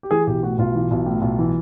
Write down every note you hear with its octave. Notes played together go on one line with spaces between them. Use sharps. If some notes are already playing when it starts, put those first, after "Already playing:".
G4
E3 G#4
B1 G4
A2 F#4
B1 F4
E3
B1
A2
B1
E3